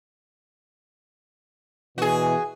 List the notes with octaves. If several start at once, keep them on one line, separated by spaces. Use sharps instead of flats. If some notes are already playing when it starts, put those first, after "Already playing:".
B2 E3 F#4 G#4